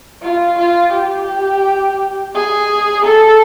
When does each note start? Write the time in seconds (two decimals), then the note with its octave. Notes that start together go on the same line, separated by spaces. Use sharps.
0.22 F4
0.58 F4
0.93 G4
2.35 G#4
3.05 A4